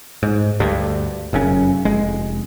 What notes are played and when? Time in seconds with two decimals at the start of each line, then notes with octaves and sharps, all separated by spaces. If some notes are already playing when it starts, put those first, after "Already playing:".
0.23 G#2
0.60 D2 G2
1.33 F1 F#2 C#3 C#4
1.85 F1 G#3